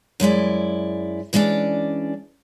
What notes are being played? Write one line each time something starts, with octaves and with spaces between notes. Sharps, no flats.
F#2 G#3 E4 D5
E3 G#3 C#4 D4 D5